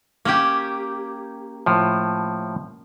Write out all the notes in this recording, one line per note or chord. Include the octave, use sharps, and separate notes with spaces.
A#3 C#4 G4
A2 F3